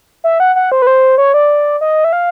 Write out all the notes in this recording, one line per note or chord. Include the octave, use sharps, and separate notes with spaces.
E5
F#5
F#5
C5
B4
C5
C#5
D5
D#5
E5
F5